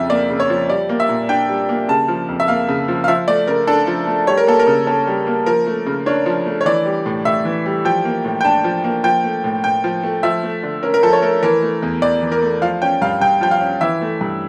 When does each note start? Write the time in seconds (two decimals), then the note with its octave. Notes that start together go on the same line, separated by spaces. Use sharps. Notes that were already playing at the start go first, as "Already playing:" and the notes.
Already playing: F2 C#3 F3 E5
0.09 A#3 D5
0.30 C#3
0.40 C#5
0.50 F3
0.69 G3 D5
0.89 A#3
1.00 E5
1.09 A#2
1.29 D4 G5
1.49 G3
1.69 A#3
1.89 C#3 A5
2.08 F3
2.29 F2
2.40 E5
2.48 A#3 F5
2.69 C#3
2.88 F3
3.04 F5
3.08 F3 E5
3.28 A3 D5
3.47 C#3 A#4
3.67 D4 A4
3.87 F3
4.07 A3
4.27 G3 C#5
4.37 A#4
4.47 A#3 A4
4.59 A#4
4.67 C#3
4.87 C#4 A4
5.07 G3
5.27 A#3
5.46 F3 A#4
5.67 A3
5.87 C#3
6.06 D4 C#5
6.26 F3
6.46 A3
6.61 C#5
6.66 E3 D5
6.86 G3
7.06 A2
7.25 A2 E5
7.45 E3
7.66 G3
7.85 F3 G5
8.05 A#3
8.25 A2
8.41 G5
8.44 D4 A5
8.64 F3
8.84 A#3
9.04 F3 G5
9.24 A3
9.44 A2
9.64 A2 G5
9.84 F3
10.03 A3
10.23 F3 E5
10.43 A3
10.63 D3
10.83 C#4 A#4
10.94 A#4
11.03 F3 A4
11.13 C#5
11.22 A3 A#4
11.43 E3 A#4
11.62 A3
11.82 E2
12.02 E2 D5
12.22 E3
12.32 A#4
12.42 A3
12.62 F3 F5
12.82 C#4 G5
13.02 G2 F5
13.21 G2 G5
13.41 F3 G5
13.51 F5
13.61 C#4
13.81 E3 E5
14.01 A3
14.21 G2